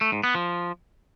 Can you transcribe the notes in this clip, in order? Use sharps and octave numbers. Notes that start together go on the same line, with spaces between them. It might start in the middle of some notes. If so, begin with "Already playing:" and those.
A3
G#2
B3
F3